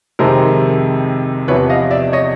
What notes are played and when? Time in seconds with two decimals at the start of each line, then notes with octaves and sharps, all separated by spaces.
0.19 F2 C3 D#3 G#3 A#4 C5
1.48 E2 C3 F3 B4 C#5
1.70 D#5 F5
1.91 D5 E5
2.13 C#5 D#5